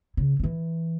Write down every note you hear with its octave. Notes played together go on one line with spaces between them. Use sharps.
C#3
C#3
E3